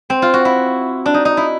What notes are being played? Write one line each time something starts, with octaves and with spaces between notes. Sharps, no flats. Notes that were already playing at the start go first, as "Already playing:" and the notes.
C4
F4
F#4
E4
D4
D#4
D#4
E4